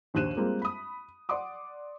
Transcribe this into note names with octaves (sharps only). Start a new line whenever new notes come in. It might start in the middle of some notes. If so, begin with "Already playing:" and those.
A#1 D#2 C5 F#6 D#7 E7
G3 G#3 A#3 C4 F4
B5 D#6
D5 F#5 C6 D6 D#6